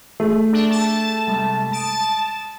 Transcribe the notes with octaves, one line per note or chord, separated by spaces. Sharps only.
A3 G#4
D4
A5
C3 G3 G#3
A5 D#6 D7 D#7